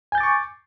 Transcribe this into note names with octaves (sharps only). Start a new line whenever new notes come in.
G#5 C#6 D6 G6 A6